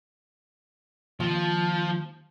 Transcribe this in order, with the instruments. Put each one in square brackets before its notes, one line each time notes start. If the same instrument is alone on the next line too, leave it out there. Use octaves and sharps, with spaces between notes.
[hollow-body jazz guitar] D#2 [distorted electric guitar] F3